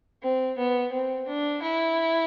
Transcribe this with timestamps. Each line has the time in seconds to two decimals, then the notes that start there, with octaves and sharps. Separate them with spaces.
0.22 C4
0.58 B3
0.92 C4
1.28 D4
1.62 E4